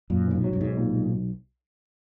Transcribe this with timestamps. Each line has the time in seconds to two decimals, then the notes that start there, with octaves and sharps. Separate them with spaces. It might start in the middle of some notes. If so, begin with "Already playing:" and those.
0.10 F#2 A#2
0.27 B1 A2
0.35 G#2
0.44 F#3
0.53 G2
0.60 B1 G#2
0.77 A#2
0.93 B1